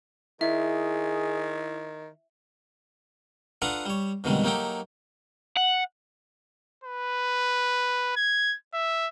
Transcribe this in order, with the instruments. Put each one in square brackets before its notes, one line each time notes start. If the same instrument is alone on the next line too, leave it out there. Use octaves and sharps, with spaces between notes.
[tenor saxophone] D#3 [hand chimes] E4 [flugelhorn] G#4 [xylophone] E5
[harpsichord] D4 F4 A4 B4 F#5 A#5
G3 C#5
F2 B2 D3 D#3 G3 G#3
F#3 A#3 D#4 G4 A4 G5
[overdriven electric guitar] F#5
[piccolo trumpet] B4
G#6
E5